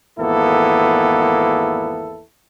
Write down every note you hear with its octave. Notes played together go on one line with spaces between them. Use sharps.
G#1 E2 A#3 B3 E4 A4